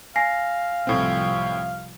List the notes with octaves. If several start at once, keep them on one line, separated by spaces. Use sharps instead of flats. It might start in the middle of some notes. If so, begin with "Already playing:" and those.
F5 G#5 A#6 C7
C2 A2 F3 C4